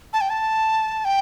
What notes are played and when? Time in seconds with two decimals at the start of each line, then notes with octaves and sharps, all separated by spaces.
0.13 A5
0.21 G5
0.30 A5
1.05 G5